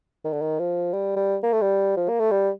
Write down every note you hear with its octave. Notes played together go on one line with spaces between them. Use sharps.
D#3
D3
D#3
F3
G3
G3
A#3
A3
G3
F3
A#3
A3
G3